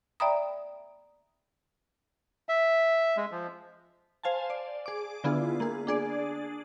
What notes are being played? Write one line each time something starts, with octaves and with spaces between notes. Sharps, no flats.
D5 E5 G5 A#5 B5 D#6
E5
G#3
F3
C5 F5 G#5 A5
D5
G#4 D6
D3 B3 E4 F4 G#4
A#3 G#4
D4 G#4 D5